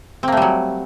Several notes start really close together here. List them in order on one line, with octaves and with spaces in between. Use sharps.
C4 A#3 A3 G3 F#3